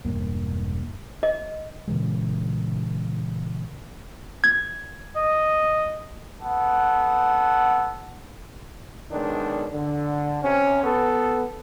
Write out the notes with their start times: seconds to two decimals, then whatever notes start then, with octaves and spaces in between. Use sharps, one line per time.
0.05 E1 G2 A#3
1.23 D#5
1.88 A#2 C#3 E3 G#3
4.44 G#6
5.16 D#5
6.42 B3 A4 F#5
9.11 B1 D#3 G#3 D4
9.72 D3
10.42 C3 C#4
10.83 B3 A4